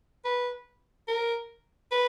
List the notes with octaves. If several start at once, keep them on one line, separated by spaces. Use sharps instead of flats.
B4
A#4
B4